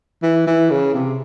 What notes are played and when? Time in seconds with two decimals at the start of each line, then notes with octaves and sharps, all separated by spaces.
0.23 E3
0.47 E3
0.70 C#3
0.95 C3